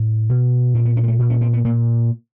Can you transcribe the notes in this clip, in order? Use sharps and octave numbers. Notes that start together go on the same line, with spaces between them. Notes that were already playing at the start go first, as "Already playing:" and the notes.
Already playing: A2
B2
A#2 C4
B3
C#4
A#3
A3
A#2
C#4
C4
B3
A#2 A#3